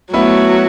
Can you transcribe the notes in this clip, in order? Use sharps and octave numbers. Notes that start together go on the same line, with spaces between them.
F#3 A3 B3 E4 F#4